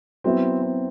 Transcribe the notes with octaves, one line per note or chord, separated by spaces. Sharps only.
F#3 B3 C4 E4
C4